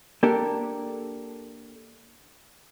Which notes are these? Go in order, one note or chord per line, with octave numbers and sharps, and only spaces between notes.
A#3 D4 G4 A4 A#4